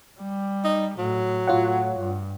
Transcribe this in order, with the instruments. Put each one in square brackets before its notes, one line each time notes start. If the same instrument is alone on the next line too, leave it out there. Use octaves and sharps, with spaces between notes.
[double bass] G3
[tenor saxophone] D#4
[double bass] A2 [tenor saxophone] F#3
[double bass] A2 [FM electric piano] F4 C#5 F#5
[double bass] G2